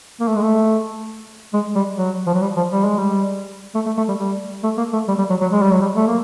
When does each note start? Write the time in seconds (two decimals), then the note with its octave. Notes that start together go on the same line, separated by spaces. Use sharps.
0.20 A#3
0.28 A3
0.36 G#3
0.43 A3
1.53 G#3
1.75 G3
1.97 F#3
2.27 F3
2.34 F#3
2.42 G3
2.57 F3
2.71 G3
2.85 G#3
2.99 G3
3.75 A3
3.86 A3
3.97 A3
4.08 G3
4.19 G3
4.64 A3
4.78 A#3
4.93 A3
5.08 G3
5.18 G3
5.30 F#3
5.41 F#3
5.52 G#3
5.62 G3
5.72 F#3
5.81 G3
5.96 A3
6.07 A#3